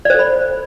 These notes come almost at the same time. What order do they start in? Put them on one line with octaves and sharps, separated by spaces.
D5 C5 A4 B5